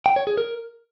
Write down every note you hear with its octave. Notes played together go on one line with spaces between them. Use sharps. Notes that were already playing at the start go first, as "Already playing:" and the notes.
G5
C#5
G#4
A#4